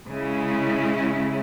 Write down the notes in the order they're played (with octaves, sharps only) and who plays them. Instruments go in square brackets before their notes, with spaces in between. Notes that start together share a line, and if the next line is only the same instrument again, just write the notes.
[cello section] C#3 G#3 C#4 E4